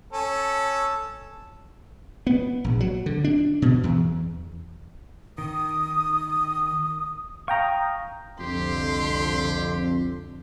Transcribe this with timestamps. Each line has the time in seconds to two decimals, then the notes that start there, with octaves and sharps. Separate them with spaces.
0.13 C#4 A4
2.27 B3
2.64 A#1
2.80 F#3
3.06 D3
3.24 D4
3.62 B2
3.84 E2
5.38 D#3 D#6
7.48 F5 G5 A#5 C#6 D#6
8.40 C2 F2 D3 G4 C6